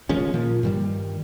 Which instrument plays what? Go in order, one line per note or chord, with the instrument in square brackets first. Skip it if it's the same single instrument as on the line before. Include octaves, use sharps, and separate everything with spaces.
[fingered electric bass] D#3 F3 G#3 C#4
A#2 F3 A#3
G2 D#3 G3